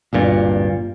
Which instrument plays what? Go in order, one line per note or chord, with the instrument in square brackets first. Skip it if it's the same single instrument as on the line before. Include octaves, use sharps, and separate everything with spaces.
[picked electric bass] D1 G1 G2 A#2